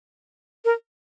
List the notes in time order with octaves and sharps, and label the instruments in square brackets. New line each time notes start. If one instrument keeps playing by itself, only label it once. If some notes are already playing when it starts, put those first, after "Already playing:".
[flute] A#4